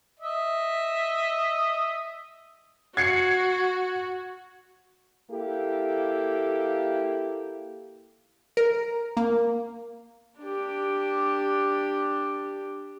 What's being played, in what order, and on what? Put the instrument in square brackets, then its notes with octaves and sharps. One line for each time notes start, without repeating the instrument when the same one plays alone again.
[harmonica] D#5 E5
[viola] F#4 [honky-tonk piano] G#6 C7 C#7
[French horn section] A#3 E4 G4 A4
[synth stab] A#4
A#3
[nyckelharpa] D4 G4